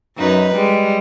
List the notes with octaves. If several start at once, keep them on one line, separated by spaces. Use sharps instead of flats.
F#2 D#4 B4
G3 G#3